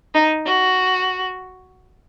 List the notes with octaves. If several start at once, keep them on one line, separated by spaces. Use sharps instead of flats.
D#4
F#4